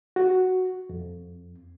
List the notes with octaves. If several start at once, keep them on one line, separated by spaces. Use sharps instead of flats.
F#4
F2